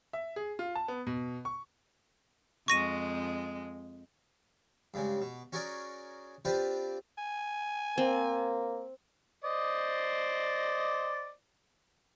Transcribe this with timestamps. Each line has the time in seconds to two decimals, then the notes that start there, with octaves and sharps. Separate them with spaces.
0.13 E5
0.36 G#4
0.59 F4
0.76 A5
0.88 B3
1.07 B2
1.45 C#6
2.68 F2 G#3 C#6 A#6 D#7
4.94 G2 C#3 G#3
5.21 B2
5.53 C#4 F#4 G#4 A#4 D5
6.45 C4 D4 F4 G4 B4 C5
7.18 G#5
7.98 A#3 C4
9.44 C5 D5 D#5